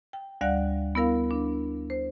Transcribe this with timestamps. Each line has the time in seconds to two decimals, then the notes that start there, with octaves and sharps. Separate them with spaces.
0.13 G5
0.41 D2 G3 D5 F5 F#5 F#6
0.95 B3 E4 A#4 F5
1.31 D4
1.90 C5